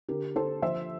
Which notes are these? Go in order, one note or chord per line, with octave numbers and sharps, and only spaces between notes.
D3 G4 A#4
D3 A4 C5
F3 C5 E5